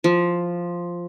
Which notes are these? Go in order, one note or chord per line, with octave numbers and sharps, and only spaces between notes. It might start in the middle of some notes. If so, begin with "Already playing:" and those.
F3